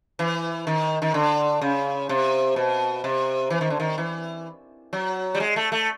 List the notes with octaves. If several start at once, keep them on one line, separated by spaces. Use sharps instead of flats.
E3
D#3
D#3
D3
C#3
C3
B2
C3
E3
D#3
D3
D#3
E3
F#3
G3
G#3
A3
A3